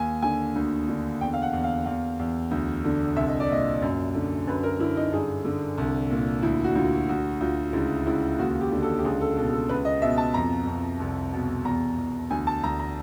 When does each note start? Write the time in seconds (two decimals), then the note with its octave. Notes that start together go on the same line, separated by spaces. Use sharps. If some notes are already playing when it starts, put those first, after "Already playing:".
Already playing: D#2 G#5
0.22 D3 G#5
0.55 D2
0.88 D3
1.21 E2 G5
1.33 F5
1.42 F#5
1.53 E2
1.64 F5
1.86 E2 F5
2.19 E2
2.51 D2
2.84 D3
3.16 C2 E5
3.28 D#5
3.40 D5
3.50 A#2 D#5
3.82 F#2
4.15 D3
4.47 F#2 B4
4.63 A#4
4.79 D3 E4
4.97 D#4
5.12 G2 G#4
5.45 D3
5.78 C2
6.10 A#2
6.42 D2 E4
6.64 F#4
6.75 D2 F4
7.08 D2 F#4
7.41 D2 F4
7.73 C#2 E4
8.06 C#2 E4
8.39 D#2 F#4
8.61 G4
8.71 D3
8.83 A4
8.99 G4
9.04 C#2 G#4
9.21 A4
9.37 B2 A4
9.53 A4
9.69 C#2 B4
9.85 D#5
10.02 B2 E5
10.18 A5
10.34 F2 A#5
10.67 F2
11.00 C2
11.33 B2
11.65 E2 A#5
11.98 E2
12.30 D2 G#5
12.47 A5
12.63 D2 A#5
12.79 A#5